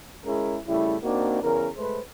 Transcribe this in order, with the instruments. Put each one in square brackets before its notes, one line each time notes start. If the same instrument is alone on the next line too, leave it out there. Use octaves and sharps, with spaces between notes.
[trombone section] G#3 C#4 E4 G#4 A#4
C#3 G3 A3 E4
A#3 C4 D4 D#4 F#4
E2 C#3 G#4 A#4
G#3 A3 B4 C5